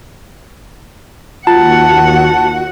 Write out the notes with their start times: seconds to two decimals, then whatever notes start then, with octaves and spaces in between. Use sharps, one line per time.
1.47 D#2 F4 F#4 F#5 A5